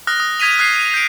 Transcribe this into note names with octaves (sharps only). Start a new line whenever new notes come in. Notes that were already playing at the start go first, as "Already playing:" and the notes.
D#6 F6 F#6 A#6
D#6
D#6 G#6 B6 D#7 F7
D#6 F#6 G#6 C7
D#7
G6 D7